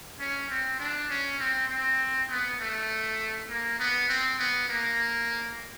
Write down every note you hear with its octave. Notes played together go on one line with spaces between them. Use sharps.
C#4
C4
D4
C#4
C4
C4
B3
A3
A#3
B3
C4
B3
A#3